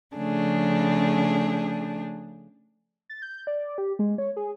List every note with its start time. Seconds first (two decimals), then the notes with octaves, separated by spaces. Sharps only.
0.16 C#3 F3 A3 D4 G#4
3.10 A6
3.22 G6
3.47 D5
3.78 G4
3.99 G#3
4.18 C#5
4.37 G#4